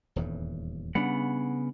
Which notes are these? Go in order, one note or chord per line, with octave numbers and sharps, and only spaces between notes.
D#1 E2 G2
C#3 G3 B3 D4 F#5